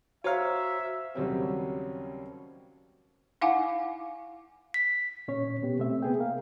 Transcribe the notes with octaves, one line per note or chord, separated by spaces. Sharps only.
F#4 C5 C#5 E5 F5 A#5
D#2 C#3 F#3 G3 C4 C#4
D#4 E4 F5 F#5 G#5 D6
B6
A#2 C#4 C#5
B2 B3 G4
C3 A3 C4 E5
B3 G#4 G5
A#3 A#4 F5